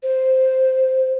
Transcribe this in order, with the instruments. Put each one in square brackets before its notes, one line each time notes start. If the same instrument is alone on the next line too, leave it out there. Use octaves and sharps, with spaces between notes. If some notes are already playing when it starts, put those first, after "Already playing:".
[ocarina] C5